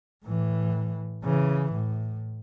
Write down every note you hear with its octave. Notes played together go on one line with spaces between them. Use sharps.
A2 E3
C#3 E3
A2